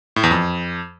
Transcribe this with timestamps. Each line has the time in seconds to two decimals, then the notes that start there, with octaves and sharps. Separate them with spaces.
0.16 A2
0.23 E2
0.31 F2